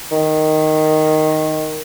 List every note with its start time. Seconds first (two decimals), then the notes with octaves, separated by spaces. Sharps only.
0.12 D#3